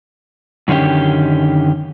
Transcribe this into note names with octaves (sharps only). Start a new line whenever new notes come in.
F#2 D3 D#3 C#4 G4